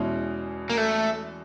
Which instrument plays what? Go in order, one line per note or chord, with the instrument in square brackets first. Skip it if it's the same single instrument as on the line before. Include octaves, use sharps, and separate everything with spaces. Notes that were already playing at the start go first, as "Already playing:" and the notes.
Already playing: [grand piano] E2 B2 G#3 C#4 E4
[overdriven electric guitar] A#3
A3